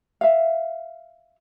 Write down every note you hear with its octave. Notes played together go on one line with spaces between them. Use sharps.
E5 F5